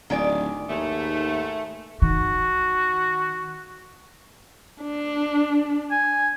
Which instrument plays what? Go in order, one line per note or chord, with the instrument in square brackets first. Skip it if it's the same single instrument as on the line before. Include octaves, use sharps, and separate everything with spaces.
[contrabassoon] D1 [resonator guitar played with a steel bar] D#3 G#3 D5
[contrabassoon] D#2 [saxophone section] G#2 A3
[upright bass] D#3 [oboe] F#4
[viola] D4
[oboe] G#5